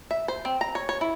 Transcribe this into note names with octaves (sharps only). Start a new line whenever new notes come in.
E5
C5
C4
A#5
C#5
C#5
E4